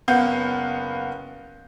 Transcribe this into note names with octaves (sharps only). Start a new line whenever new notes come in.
F#1 B3 F5 F#5 G6